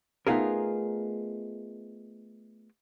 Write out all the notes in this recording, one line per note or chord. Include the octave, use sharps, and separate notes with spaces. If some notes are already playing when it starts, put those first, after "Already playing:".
A3 B3 D#4 F4 G#4 A#4